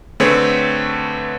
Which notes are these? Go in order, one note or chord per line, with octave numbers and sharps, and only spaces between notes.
D3 A3 C4 G#4 B4 C#5